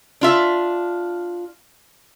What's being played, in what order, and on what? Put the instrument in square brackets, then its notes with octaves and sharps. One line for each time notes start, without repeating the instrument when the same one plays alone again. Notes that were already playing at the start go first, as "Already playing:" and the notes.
[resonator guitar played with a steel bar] D4 F4 E5